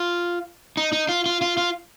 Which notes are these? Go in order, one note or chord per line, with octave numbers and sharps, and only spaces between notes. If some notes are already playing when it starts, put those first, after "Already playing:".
Already playing: F4
D#4
D#4
F4
F4
F4
F4